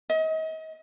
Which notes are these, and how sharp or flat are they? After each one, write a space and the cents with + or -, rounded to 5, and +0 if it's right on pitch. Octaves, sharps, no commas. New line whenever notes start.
D#5 +35